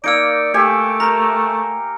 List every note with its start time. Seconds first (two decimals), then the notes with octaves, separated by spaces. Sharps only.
0.04 A#3 D#4 D5 E6 C#7 D7
0.54 A3 G4 E5 G#5
1.00 A#4 A#5